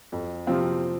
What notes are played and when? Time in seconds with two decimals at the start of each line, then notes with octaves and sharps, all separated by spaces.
0.12 F2
0.47 C3 F3 C4 F4